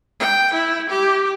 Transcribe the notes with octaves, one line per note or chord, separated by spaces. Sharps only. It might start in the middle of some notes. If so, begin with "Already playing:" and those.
G5
E4
G4